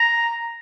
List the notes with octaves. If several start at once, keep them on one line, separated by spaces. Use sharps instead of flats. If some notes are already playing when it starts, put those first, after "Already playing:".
Already playing: A#5